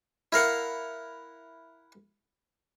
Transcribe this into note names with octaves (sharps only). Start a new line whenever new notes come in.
E4 A#4 F5 F#5